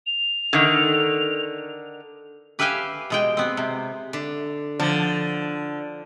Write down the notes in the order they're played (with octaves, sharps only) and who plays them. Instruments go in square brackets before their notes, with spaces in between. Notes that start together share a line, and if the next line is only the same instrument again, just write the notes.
[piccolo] F7
[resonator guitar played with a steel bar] D3 D#3
[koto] G4 B4 E5 F5 G5 G#5
B2 G#3 G5
B3 C4
C3
[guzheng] D3
[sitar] D3 [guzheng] F3